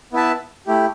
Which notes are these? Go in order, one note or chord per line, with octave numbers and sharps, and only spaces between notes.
B3 E4 B4 E5 A5
A3 E4 G4